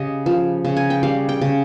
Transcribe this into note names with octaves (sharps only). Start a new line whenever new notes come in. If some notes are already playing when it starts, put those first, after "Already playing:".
Already playing: C#3 G4 D#5
F3
C#3
G#5
G5
G3 F5
G5
C#3